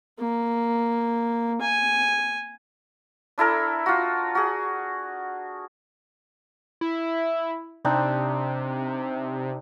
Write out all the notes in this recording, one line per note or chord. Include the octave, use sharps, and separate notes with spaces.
A#3
G#5
D4 E4 A4 A#4
F4 F#4
F#4 G#4
E4
C3 C4 D4 D#4